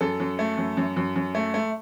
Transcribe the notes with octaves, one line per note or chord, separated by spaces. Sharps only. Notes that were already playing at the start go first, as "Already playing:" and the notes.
F#2 A4
F#2
A3
F#2
F#2
F#2
F#2
A3
A3